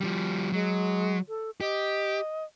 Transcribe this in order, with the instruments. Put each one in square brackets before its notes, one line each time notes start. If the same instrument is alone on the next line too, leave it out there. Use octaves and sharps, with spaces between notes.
[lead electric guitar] F3 G3
[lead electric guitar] F#3 [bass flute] G#3
[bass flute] A4
[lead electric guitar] G4 [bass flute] D#5